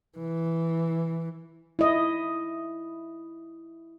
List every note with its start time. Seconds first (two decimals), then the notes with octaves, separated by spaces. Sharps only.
0.18 E3
1.79 E4 D#5